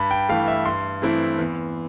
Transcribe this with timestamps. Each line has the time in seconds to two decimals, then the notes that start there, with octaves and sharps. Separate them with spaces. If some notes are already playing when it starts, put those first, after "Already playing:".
Already playing: G2 B5
0.11 G5
0.29 E3 A3 F5
0.48 E5
0.65 G2 C6
1.02 E3 A3 C4 E4
1.38 E2